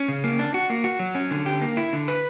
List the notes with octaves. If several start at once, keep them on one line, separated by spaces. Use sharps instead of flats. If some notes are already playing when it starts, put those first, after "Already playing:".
Already playing: C#4
C#3
A#3
D4
F#4
A#3
F#4
F#3
C#4
D3
G4
A#3
E4
D3
B4